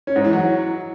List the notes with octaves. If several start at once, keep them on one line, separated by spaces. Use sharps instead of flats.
C#4
G#2
E3
F#3